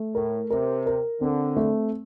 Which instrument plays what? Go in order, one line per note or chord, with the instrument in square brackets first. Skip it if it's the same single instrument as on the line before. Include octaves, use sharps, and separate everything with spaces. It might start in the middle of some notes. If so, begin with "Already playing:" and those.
Already playing: [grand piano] A3
[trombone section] A2 [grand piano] A#4
[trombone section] C3 [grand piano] A#4
[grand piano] A#4
[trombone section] D3 [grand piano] C4
[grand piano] A3